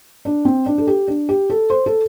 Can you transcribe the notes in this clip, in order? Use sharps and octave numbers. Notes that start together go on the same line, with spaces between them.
D4
C4
D4
A4
G4
D4
G4
A4
C5
A4